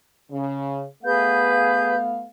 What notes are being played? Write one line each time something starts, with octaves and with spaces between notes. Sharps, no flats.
C#3
A3 B3 G#4 B4 F5 G6